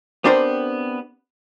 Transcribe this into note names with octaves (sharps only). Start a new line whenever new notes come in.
B3 C4 D4 G4 A#4 C5